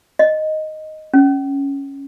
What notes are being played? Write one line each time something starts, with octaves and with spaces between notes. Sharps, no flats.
D#5
C#4